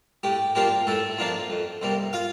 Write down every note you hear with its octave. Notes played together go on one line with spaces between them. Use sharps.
A2 G4
F3 A#3 D4 F4 G4
A2 A3 A4
F3 A#3 D4 F4
F2
C3 G3 A#3
F4 F5